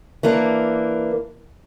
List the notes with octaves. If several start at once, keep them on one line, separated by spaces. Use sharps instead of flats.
E3 A#3 D4